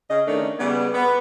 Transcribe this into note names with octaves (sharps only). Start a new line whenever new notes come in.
C#3 D#5
D#3 A3 C#4 D4
C#3 G3 B3
B3